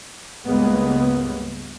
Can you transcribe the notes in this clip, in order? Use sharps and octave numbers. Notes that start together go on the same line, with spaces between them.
C#2 G2 C#3 G#3 A#3 B3